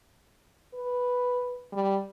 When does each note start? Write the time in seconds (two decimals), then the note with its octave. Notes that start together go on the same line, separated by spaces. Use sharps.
0.74 B4
1.73 G3